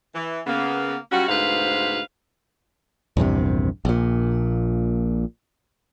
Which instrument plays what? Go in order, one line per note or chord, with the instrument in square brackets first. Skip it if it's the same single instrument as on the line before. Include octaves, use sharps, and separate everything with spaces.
[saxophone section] E3
C#3 A#3 B3
G3 C#4 F4 F#4
D2 G#2 B2 B4 C5 F5
[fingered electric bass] A#1 E2 G2 C3
A#1 A#2